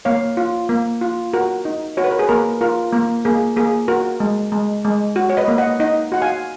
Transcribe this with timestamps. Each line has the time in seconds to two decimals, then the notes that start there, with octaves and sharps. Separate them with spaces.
0.05 A#3 C#5 F5
0.37 F4
0.69 A#3
1.01 F4
1.33 F#4 A#4
1.65 D#4
1.97 F#4 C#5
2.04 B4
2.11 A#4
2.19 G#4 B4
2.29 A#3 A#4
2.61 F4 A#4
2.93 A#3 A#4
3.25 A#3 G#4
3.56 A#3 G#4
3.88 F#4 A#4
4.20 G#3
4.52 G#3
4.85 G#3
5.16 F#4
5.30 C#5
5.37 B4 D#5
5.48 A#3
5.58 D#5 F#5
5.80 D#4 D#5 F#5
6.12 F#4 F#5
6.22 F5 G#5